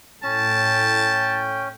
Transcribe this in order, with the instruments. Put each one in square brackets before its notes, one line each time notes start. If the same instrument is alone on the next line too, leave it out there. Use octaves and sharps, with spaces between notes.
[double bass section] A2 [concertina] C#4 [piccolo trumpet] G5 [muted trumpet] A5